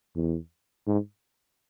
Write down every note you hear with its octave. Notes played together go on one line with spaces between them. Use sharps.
E2
G#2